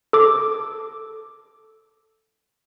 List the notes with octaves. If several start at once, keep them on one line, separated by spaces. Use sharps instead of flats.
A4 D6